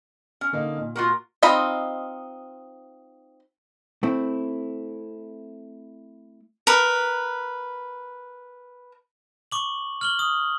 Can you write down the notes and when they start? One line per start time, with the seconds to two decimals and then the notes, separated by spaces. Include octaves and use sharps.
0.41 C#4
0.53 D3 A#3 D#4
0.78 A#2
0.95 F4 F#4 A#4
1.43 C4 D#4 F4 D#5 B5
4.03 A3 C4 E4
6.67 A#4 B4
9.52 C#6 D6 F#7
10.01 F6 F#7 G7
10.19 D#6